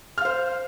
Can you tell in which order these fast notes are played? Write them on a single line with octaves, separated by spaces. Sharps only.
F6 F5 C5